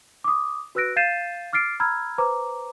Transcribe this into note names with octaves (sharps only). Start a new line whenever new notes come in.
D6 D#6
F#4 B4 E6 F#6 A#6 D7
F5 G6 A6 C7 D#7 E7
D6 F6 A6 C7 D7
A#5 B5 E6 F6 G#6
B4 C5 A#5 D6